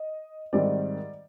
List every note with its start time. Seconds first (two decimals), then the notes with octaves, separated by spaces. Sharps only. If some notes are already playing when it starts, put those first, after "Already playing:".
Already playing: D#5
0.53 G#2 D#3 G3 C4 D5